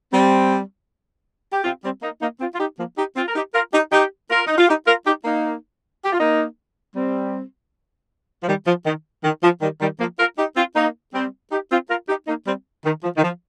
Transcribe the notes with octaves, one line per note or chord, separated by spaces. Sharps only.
G3 C4
G4
C4 F4
G3 C4
A#3 D#4
A#3 D#4
C4 F4
F4
D#4 G4
F3 A#3
D#4 G4
C4 F4
A#4
D#4 G4
F4 A#4
D#4 G4
D#4 G4
F4 A#4
D#4
F4
D#4 G4
F4 A#4
D#4 G4
A#3 D#4
G4
F4
A#3 D#4
G3 C4
F3
D#3 G3
F3
D#3
D#3
F3
D#3 G3
D#3 G3
F3 A#3
F4 A#4
D#4 G4
C4 F4
A#3 D#4
G3 C4
D#4 G4
C4 F4
F4 A#4
D#4 G4
A#3 D#4
G3 C4
D#3
F3
D#3
F3